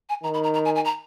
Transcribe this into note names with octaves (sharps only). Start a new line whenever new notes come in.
G#5
D#3 A#5
B5
A#5
A#5
G#5
G#5
A#5